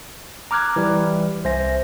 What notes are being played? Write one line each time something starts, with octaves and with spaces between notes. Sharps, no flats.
A#5 D6 F6 F#6 G#6
E3 G3
C2 C5 E5 G#5 A#6